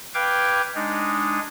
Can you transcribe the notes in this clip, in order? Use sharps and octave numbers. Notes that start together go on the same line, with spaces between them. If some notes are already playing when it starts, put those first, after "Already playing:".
B4 F5 G5 D6 G6 G#6
G#3 D4 D#4